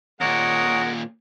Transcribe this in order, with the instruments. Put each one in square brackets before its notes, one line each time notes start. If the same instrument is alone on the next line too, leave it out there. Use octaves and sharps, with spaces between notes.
[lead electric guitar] D#2 A#2 [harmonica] G#3 F#5 [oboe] A#4 [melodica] C#5 D#6